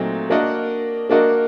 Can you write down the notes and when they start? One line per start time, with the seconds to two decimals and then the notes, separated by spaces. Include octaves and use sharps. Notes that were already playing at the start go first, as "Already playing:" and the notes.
Already playing: A#2 F#3 A3 C4 D#4
0.30 A#3 D4 F#4 A#4 D#5
1.09 A#3 D4 F#4 A#4 D#5